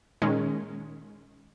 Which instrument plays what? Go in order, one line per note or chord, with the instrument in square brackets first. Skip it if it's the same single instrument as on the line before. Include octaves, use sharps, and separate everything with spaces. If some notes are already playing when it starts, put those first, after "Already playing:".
[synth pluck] A#2 D#3 G#3 C#4